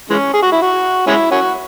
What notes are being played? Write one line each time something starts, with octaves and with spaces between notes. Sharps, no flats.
E3 G#3 C#4
G#4
F#4
E4
F#4
G#3 C#4 E4
C#4 F#4